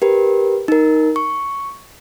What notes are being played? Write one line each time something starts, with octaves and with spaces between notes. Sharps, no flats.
G4 A#4 B4
D#4 A#4
C#6